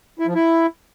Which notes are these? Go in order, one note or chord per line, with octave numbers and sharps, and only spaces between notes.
E4
F3
E4